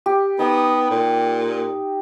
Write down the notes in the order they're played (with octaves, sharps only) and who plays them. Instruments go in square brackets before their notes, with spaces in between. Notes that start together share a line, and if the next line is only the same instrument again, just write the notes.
[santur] G4
[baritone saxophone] B3 [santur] D#4 G5 D#6
[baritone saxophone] A#2